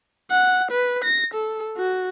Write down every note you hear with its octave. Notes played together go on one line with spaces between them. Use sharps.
F#5
B4
A#6
A4
F#4